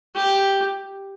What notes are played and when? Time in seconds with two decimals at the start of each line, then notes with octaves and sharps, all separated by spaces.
0.15 G4